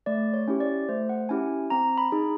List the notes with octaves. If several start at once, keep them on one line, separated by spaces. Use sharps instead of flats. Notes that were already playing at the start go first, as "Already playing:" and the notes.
A3 D5
C#5
C#4 E4 G4
D5
A3 C5
F#5
C#4 E4 G4 G#5
C4 A#5
B5
D#4 G#4